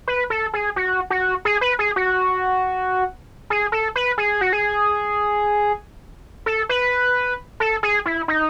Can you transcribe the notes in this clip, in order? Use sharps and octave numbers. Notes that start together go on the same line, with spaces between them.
B4
A4
G#4
F#4
F#4
G#4
B4
G#4
F#4
G#4
A4
B4
G#4
F#4
G#4
A4
B4
A4
G#4
E4
D#4